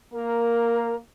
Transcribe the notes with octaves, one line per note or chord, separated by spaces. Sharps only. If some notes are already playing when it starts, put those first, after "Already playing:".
A#3 A#4